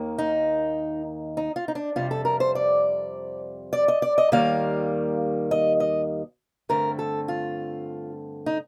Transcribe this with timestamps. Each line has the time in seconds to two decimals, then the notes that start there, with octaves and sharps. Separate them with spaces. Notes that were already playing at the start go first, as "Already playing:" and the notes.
Already playing: D#2 D#3 A#3
0.18 D#4
1.37 D#4
1.56 F4
1.68 D#4
1.75 D4
1.96 F2 C3 G3 F4
2.11 A4
2.25 A#4
2.40 C5
2.55 D5
3.73 D5
3.88 D#5
4.02 D5
4.18 D#5
4.32 D#2 D#3 G3 A#3 F5
5.51 D#5
5.80 D#5
6.69 G2 D3 A3 C4 A#4
6.99 A4
7.28 F4
8.46 D#4